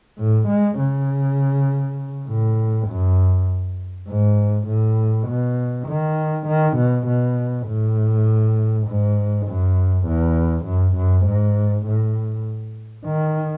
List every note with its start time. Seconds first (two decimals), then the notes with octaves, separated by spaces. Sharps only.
0.19 A2
0.49 G#3
0.79 C#3
2.28 A2
2.88 F#2
4.08 G#2
4.68 A2
5.28 B2
5.88 D#3
6.47 D#3
6.77 B2
7.07 B2
7.67 A2
8.87 G#2
9.47 F#2
10.07 E2
10.66 F#2
10.97 F#2
11.26 G#2
11.86 A2
13.06 D#3